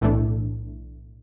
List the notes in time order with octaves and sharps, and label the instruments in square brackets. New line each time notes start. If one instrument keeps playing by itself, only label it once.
[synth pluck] B1 A2 E3 A3 D4